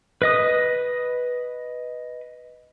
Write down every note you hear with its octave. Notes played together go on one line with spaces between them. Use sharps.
B4 D#5 D#6